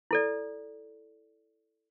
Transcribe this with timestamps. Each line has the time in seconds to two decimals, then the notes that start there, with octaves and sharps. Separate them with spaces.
0.11 E4 A4 D5